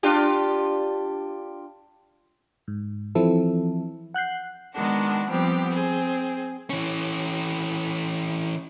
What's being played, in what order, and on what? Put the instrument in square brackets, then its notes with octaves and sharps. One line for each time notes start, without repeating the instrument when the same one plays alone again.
[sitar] D4 F4 G4
[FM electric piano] G#2
E3 F3 C4 E4 A4
F#5 F#6 G6 C7
[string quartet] D#3 G#3 B3 D4 F#4
F3 G3 B3 C4 G4
C4 G#4
[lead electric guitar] E3 C#4